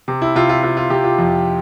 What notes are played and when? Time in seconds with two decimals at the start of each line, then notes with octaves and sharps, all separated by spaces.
0.08 C3
0.22 E4
0.35 C3 F4
0.49 F4
0.63 C3 F4
0.77 F4
0.90 C3 G4
1.04 F4
1.18 F2